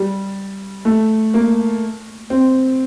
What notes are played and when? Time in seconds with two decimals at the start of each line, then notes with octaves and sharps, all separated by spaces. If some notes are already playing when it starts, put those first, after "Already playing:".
Already playing: G3
0.85 A3
1.34 A#3
2.30 C4